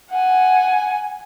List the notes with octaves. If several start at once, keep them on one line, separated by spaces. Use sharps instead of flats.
F#5 G#5